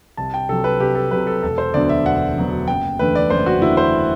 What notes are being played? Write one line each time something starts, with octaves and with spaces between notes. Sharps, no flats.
C2 A5
G5
C3 F#3 A4
B4
C2 G4
A4
C3 F#3 B4
A4
E1 A4
C5
D2 D3 F#3 B3 D5
E5
E1 F#5
D2 D3 F#3 B3
F#1 G5
E2 D3 A3 B4
D5
F#1 C5
F#4
E2 D3 A3 E4
C5